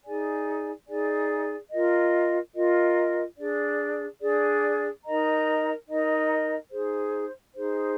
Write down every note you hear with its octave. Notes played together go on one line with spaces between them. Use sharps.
D#4 G#4 D5 G#5
D#4 G#4 D5 G#5
F4 A#4 D#5
F4 A#4 D#5
D4 G#4 D5
D4 G#4 D5
D#4 A#4 D#5 A#5
D#4 A#4 D#5 A#5
D#4 G#4 C5
D#4 G#4 C5